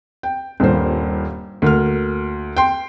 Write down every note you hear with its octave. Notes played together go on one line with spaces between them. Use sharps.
G5
D#1 G2 A#2 C5
D2 A#3 F6
G5 C6